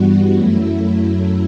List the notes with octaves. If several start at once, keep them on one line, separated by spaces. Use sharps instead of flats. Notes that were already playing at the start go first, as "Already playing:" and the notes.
Already playing: G2 E3 G3 B3 F#4
F#2 F#3 A3 E4